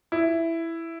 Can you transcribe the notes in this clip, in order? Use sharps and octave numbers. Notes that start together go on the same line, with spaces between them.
E4